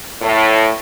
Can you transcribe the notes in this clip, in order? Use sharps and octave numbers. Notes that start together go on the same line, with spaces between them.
A2